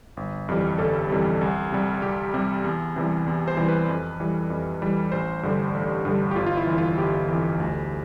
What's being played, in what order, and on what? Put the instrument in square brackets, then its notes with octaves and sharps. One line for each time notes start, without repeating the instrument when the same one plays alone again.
[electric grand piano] G1
F2 C3 E3 G3
G1 A4
F2 C3 E3 G3
C2
C3 G3
C2 G4
C3 G3
E2
C3 E3 G3
E2
C5
C3 E3 G3
B4
F2
E3 G3
F2
E3 G3
A1 C5
G2 D3 G3
A1
G2 D3 G3
G4
G1 F4
F4
E4
F2 E3
F4
G1 G4
F2 E3
D2